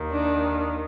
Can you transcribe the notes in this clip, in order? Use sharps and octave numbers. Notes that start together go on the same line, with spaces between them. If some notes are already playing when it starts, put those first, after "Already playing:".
Already playing: D#2 D#3
D4